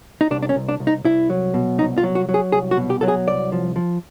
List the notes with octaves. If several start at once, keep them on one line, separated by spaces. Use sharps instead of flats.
D#4
C2 D4
D4
C#4
C2
D4
C2
D#4
C2 E4
F#3
B2
C2 D#4
F4
F#3
F#4
F#3
G#4
C2 G#4
F#4
B2
G4
F#3 A4
G#4
C2 D5
F3
F3